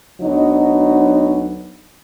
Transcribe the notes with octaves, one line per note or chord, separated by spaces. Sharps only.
D2 F#3 B3 D4 D#4